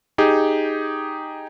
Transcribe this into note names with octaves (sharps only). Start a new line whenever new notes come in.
D#4 G4 G#4